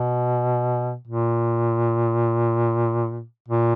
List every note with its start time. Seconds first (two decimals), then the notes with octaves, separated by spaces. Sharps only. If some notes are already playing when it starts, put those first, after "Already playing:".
Already playing: B2
1.07 A#2
3.48 A#2